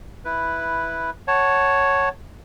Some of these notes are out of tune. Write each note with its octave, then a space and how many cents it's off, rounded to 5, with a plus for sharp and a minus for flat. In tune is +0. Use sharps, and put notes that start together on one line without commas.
E4 +0 B4 +0
C#5 +0 F#5 +15 A5 +0